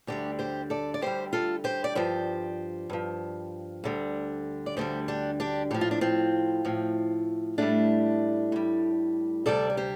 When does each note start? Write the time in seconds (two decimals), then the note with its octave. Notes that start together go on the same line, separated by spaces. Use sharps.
0.07 D2 D3 G3 D4 G4
0.39 G4 C5
0.70 A4 D5
0.94 D5
1.01 D2 D3 G3 G4 C5
1.33 F4 A4
1.64 G4 C5
1.84 D5
1.95 G2 F3 G4 C5
2.90 G2 F3
3.84 D2 D3 G3
4.66 D5
4.76 D2 D3 G3 G4 C5
5.08 D4 G4
5.40 D4 G4
5.71 A2 F3 G4
5.81 F4
5.91 D4
6.01 C4 F4
6.65 A2 F3
7.58 A2 G3 A3 D4
8.52 A2 G3
9.46 D2 C3 G3 A4 D5
9.70 D5
9.77 G4 C5